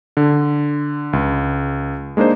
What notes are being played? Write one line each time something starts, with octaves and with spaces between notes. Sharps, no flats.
D3
C#2
G#3 A#3 D4 D#4 C5